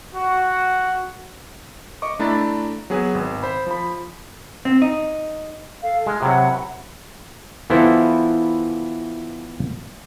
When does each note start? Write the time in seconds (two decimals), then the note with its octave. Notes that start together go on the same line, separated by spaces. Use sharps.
0.14 F#4
2.02 D#5 C#6 D6
2.19 A3 D4 E4 A#5 B5 A6
2.90 F#3 B3 G#4 B4
3.15 G#1
3.43 C5 B5
3.67 F3 B5
4.65 C4
4.82 D#4
5.82 A4 F5
6.06 G#3 F6
6.22 C3 F#3 F#5 B5
7.70 E3 B3 E4 F4 A4 C5